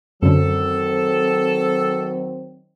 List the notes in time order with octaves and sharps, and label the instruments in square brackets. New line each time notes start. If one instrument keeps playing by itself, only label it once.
[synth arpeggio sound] F#2 D3 [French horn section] D#3 F#3 C4 [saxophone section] A4